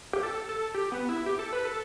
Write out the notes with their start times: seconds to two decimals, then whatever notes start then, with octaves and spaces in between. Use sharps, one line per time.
0.13 G4
0.23 A4
0.49 A4
0.74 G4
0.92 B3
1.09 E4
1.26 G4
1.39 A4
1.53 B4
1.65 A4